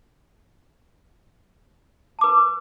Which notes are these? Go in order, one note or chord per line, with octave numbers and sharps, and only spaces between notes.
B4 A5 D6